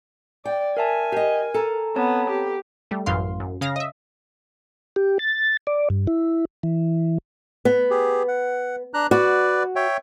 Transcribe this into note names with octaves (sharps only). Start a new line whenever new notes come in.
D5 G5
A#4 E5 G#5 A5
G4 A#4 D#5
A4 A#5
B3 C4 C#5 A5
G4
G3 A3
A1 F#2 E3 F5 C6
F#2
C#3 F5 A#6
D#5 E5
G4
A6
D5
G2
E4
E3
B3
G4 G#4
F#5
D4 A#5 F#6
F#4 B4 D5
C#5 E5 G5